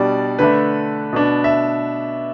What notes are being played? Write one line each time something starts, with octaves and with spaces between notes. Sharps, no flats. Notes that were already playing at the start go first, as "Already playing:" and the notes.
Already playing: B2 G3 D4 D5
D3 A3 D4 B4
B2 B3 D4
E5